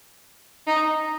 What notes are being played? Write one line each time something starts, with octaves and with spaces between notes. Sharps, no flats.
D#4